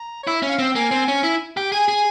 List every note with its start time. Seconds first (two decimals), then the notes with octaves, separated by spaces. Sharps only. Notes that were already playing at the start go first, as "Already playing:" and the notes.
Already playing: A#5
0.23 E4 C#5
0.36 E5
0.43 C#4
0.49 F5
0.59 C4 G5
0.75 A#3 G#5
0.91 C4
1.08 C#4
1.23 E4
1.57 G4
1.72 G#4 G#5
1.89 G#4